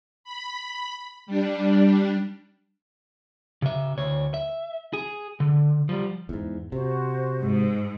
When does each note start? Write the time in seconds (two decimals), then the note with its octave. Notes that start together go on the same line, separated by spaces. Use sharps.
0.24 B5
1.26 G3 D4
3.62 C#3 E5
3.98 D2 C#5
4.34 E5
4.93 G#4
5.40 D3
5.89 F3 G3
6.29 E2 G#2
6.72 C3 F#4 C5
7.40 G#2